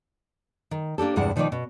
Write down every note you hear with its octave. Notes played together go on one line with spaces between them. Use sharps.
D#3
A#3 D4 G4 A4
E2 G2 C3 G#3 E4 F#5
B2 D#3 F3 C#4 D#4 D5
B2